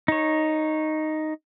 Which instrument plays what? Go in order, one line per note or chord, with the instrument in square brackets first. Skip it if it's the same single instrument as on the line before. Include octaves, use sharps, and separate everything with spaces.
[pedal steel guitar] D#4 C#5